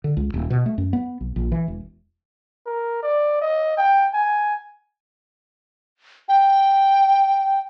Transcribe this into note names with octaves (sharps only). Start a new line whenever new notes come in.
D3
C#2
D#1
B2
A3
F#2
B3
B1
A#1
E3
E1
A#4
D5
D#5
G5
G#5
G5